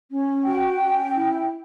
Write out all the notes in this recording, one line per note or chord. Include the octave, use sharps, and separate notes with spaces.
C#4
F#4 G5
C#4
E4